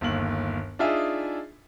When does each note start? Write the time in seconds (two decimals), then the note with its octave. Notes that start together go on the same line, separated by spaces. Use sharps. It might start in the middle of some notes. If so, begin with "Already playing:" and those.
0.01 G1 D#2 F#7
0.79 D4 D#4 F4 G#4 E5 G#5